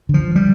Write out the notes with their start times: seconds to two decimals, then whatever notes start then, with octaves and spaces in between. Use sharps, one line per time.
0.09 D3
0.14 F3
0.36 G3